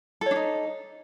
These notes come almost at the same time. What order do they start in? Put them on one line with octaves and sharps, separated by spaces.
A4 C#5 D4 D#4